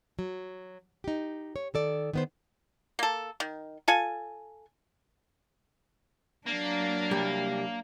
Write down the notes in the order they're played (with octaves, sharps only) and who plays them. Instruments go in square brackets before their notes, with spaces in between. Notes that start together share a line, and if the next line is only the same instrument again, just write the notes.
[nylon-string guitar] F#3
D#4 G4
C#5
D#3 A4 D5
D#3 B3 C5
[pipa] A#3 A4
D#3
F4 A4 G#5
[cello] F#3 D4 [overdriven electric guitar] A#3
[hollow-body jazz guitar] C2 G3